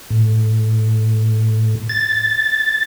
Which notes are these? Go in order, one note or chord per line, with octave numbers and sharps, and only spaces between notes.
A2
A6